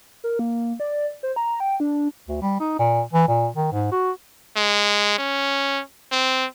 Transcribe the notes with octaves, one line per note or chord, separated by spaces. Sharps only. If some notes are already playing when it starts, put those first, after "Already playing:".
A#4
A#3
D5
C5
A#5
G5
D4
D2
G3
D#4
A#2
E3
A#2
D#3
G#2
F#4
G#3
C#4
C4